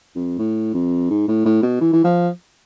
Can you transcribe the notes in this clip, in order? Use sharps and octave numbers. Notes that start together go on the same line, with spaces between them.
F2
A2
F2
G#2
A2
A2
B2
E3
E3
F3